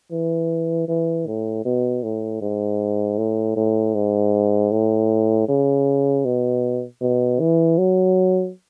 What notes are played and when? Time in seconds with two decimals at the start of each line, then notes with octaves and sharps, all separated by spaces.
0.11 E3
0.88 E3
1.27 A2
1.65 B2
2.03 A2
2.42 G#2
3.18 A2
3.56 A2
3.95 G#2
4.71 A2
5.48 C#3
6.25 B2
7.01 B2
7.40 E3
7.78 F#3